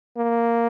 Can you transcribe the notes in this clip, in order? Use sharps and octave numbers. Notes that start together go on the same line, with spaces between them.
A#3